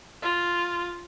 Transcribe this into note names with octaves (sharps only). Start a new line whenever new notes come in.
F4